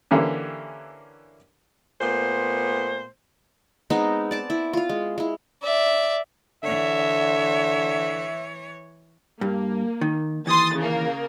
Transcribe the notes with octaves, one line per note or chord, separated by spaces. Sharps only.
D3 E3 A#3 C#4 G4
A#2 A3 B3 C5
G#3 B3 C4 D#4
D5 A5 D6
E4
F4 F5
G#3
G#3 E4
D5 E5
D3 E3 C#5 E5
G2 A#3
D#3
D#2 E3 C6 D#6 A6
C#3 A#3